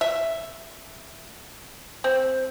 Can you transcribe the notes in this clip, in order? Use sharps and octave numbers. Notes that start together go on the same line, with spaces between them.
E5
C4